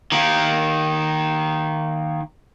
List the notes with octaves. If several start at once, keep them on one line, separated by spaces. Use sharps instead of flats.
D#3 A#3